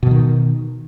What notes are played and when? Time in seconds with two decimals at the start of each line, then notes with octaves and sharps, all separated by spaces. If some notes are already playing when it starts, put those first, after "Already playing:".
0.03 B2
0.07 E3
0.11 D#3